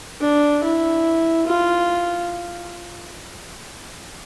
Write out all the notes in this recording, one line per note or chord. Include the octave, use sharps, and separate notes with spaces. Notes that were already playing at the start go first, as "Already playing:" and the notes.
D4
E4
F4